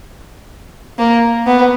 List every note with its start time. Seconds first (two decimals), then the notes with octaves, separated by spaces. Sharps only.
0.98 A#3
1.47 B3